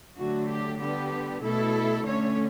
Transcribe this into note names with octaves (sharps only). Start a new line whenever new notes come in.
D3 F#3 A3 F#4
G4
D3 G3 B3 G4
B2 A3 E4 A4
D3 A3 C#4 C#5